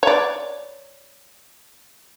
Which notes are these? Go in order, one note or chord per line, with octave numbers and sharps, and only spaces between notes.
C#5 D5